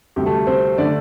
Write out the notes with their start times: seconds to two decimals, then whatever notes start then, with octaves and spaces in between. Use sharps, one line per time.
0.16 D2 C3 G3 G4
0.26 A3 A4
0.47 C4 C5
0.78 D3 A3 D4 D5